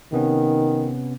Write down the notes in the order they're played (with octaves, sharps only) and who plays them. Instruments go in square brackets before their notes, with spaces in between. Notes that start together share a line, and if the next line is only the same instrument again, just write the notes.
[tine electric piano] C3 B3 C#4 [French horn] D#3